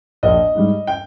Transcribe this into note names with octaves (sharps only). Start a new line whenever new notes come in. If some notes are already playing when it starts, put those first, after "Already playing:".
A#1 D#5
G#2 G3
G5